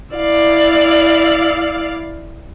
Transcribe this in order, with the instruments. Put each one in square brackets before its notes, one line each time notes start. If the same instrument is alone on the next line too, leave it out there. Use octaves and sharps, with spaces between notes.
[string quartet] E4 D5 F5